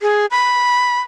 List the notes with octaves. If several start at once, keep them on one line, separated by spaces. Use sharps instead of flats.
G#4
B5